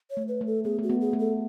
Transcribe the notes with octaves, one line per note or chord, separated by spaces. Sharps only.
C#5
A3
B4
A3
A4
B3 G#4
A3 F#4
B3
G#4
A3
A4